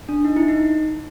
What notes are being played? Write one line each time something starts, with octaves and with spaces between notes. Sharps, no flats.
D4
D#4
E4
D#4